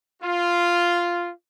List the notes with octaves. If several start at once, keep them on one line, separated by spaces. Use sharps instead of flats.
F4